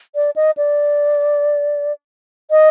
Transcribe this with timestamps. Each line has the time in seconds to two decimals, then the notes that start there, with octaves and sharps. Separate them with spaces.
0.15 D5
0.36 D#5
0.57 D5
2.51 D#5